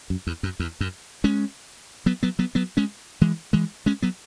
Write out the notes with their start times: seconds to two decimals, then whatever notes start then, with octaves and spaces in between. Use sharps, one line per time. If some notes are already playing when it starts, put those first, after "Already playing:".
0.10 F#2
0.27 E2
0.43 F#2
0.60 E2
0.81 F#2
1.24 G#3 C#4
2.06 F#3 B3
2.23 F#3 B3
2.39 F#3 B3
2.55 F#3 B3
2.77 G#3 C#4
3.21 E3 G#3
3.53 E3 G#3
3.86 G#3 C#4
4.02 F#3 B3